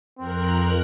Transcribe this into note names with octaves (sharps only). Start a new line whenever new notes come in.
F2 C4 A#4 F#6